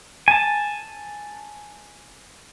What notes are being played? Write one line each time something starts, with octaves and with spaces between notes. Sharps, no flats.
G#5 A5